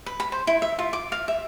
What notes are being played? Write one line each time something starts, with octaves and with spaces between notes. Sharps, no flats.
B4
B5
C5
E4
E5
F4
D6
F5
E5